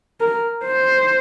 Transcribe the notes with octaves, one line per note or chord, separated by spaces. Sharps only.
A#4
C5